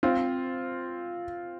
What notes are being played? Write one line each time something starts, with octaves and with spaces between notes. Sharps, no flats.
C4 F4